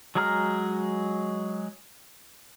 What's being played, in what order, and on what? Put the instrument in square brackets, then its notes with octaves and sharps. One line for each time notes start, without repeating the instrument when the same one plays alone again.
[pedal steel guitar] F#3 G#3 G#4 A#5 F6